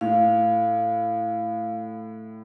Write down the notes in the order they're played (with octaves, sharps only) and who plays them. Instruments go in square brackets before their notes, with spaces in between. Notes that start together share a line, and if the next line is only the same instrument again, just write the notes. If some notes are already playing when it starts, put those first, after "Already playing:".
[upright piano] A2 [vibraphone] F5